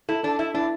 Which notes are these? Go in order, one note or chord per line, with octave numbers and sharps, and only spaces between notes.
E4 A4
D4 A4
E4 E5
D4 E4